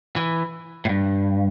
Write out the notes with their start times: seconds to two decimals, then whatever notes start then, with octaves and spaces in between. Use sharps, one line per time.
0.16 E3
0.85 A2
0.89 G2